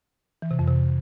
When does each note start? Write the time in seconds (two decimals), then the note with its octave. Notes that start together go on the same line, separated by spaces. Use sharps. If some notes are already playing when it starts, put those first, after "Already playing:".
0.42 E3
0.51 C3
0.59 F2
0.67 C3